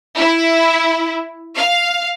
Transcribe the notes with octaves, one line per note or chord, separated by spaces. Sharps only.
E4
F5